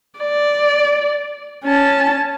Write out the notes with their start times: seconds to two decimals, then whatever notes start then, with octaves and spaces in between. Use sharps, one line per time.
0.19 D5
1.64 C#4 A5